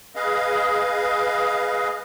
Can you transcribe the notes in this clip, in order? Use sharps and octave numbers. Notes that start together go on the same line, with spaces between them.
G#4 B4 D#5 F5